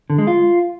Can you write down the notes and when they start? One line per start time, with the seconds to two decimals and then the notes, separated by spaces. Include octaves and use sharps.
0.10 D3
0.18 G#3
0.27 F4